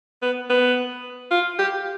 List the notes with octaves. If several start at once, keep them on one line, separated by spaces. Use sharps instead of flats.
B3
B3
F4
G4